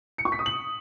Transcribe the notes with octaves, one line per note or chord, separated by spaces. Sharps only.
C#7
C#6
B6
D#6
F#7